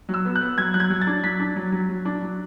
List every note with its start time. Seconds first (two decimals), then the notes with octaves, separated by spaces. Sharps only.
0.09 F#3
0.14 E6
0.25 B3
0.36 F#6
0.41 B3
0.58 F#3 G#6
0.74 F#3 F#6
0.80 G#6
0.90 F#3
1.01 A6
1.07 D4
1.23 F#3 B6
1.40 D4
1.56 F#3
1.72 F#3
1.89 F#3
2.05 D4
2.22 F#3